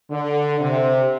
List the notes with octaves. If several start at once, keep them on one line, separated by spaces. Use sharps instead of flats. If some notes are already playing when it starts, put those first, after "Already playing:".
D3
C3